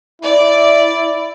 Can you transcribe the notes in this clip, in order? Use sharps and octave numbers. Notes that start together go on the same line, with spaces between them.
E4 D5